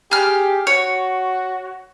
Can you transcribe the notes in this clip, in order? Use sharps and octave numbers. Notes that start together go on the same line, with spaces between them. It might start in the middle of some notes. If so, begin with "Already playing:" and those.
G4 G#4 F6
F#4 C#5